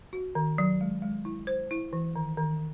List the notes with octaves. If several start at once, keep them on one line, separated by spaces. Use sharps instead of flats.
F#4
D#3
F#3
G#3
G#3
E4
C5
E4
E3
D#3
D#3